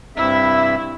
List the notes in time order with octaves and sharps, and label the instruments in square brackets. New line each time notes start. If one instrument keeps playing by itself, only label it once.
[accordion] G2 C3 E5 [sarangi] E4